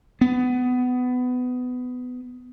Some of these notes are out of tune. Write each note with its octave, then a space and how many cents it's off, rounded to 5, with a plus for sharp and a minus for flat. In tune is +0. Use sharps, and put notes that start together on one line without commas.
B3 +20